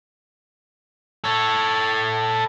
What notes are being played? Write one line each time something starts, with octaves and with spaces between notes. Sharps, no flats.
A4 C#5